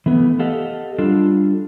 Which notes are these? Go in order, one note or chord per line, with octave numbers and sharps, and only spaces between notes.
E3 A3 B3
G4 A4 D#5 F5 F#5
G3 D4 F4 A4